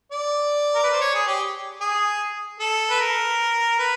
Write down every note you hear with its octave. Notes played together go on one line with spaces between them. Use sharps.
D5
A#4
B4
C5
C#5
G#4
G4
G#4
A4
B4
A#4
B4